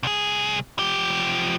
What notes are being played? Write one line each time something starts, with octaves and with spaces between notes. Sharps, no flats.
C2 G#4
F3 G4